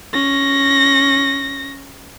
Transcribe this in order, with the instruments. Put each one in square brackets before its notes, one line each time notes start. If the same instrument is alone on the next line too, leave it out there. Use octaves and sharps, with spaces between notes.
[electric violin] C#4 A#6